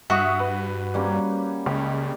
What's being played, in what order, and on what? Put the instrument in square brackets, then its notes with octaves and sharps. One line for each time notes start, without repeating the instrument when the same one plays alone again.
[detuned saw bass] G2 [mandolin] F#4 [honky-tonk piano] E5 C#6 D#6
[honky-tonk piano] B4
[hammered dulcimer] G3 A#3 C#4
[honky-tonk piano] C#2 [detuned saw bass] C#3 [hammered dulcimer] G4